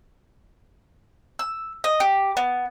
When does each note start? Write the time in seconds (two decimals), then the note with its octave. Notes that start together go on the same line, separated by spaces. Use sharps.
1.39 E6
1.84 D#5
2.00 G4
2.37 B3